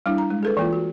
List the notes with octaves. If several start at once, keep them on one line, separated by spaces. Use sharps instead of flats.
G3 D4 E4
A#5
G#3
G#4 A4 B4
E3 A#3 F4
F#4